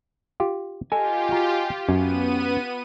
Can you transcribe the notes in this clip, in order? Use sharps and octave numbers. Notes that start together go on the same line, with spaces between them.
F4 G4
F4 G4 A4 D#5 G#5
F#4 A#5
F#2 B3 C#4 D#7